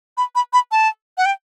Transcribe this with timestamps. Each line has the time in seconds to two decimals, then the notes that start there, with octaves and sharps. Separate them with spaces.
0.17 B5
0.35 B5
0.53 B5
0.72 A5
1.18 F#5
1.26 G5